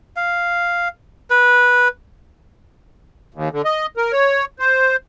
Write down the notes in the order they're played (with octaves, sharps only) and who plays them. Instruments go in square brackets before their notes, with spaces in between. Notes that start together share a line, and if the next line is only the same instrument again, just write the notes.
[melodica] F5
B4
[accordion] D#2
D3
D#5
A#4
C#5
C5